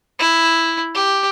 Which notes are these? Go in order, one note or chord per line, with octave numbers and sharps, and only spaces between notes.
E4
G4